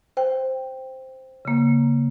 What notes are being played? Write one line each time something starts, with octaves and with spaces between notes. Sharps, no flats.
C5 G5
C#3 A#3